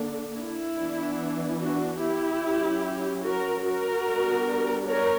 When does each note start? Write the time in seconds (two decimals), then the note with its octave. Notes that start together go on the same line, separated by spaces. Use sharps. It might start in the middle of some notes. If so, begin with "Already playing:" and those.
Already playing: D3 A#3 D4
0.38 E4
0.79 E3 B3 D4
1.61 D4 F#4
2.01 E4 G4
2.42 F#3 C#4
3.24 F#4 A#4
3.65 F#4 A#4
4.06 G3 B3 D4
4.87 A#4 C#5